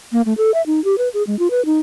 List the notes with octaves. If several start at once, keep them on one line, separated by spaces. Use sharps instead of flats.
A#3
A3
A4
E5
D#4
G4
B4
G#4
G#3
F4
B4
D#4